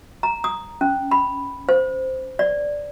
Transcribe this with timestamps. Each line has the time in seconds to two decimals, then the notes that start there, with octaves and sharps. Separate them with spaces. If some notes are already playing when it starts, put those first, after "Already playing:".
0.23 A#5
0.44 D#6
0.81 C#4
1.11 B5
1.69 C5
2.39 D5